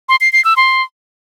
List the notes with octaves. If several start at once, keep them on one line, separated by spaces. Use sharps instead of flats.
C6
C7
C7
E6
C6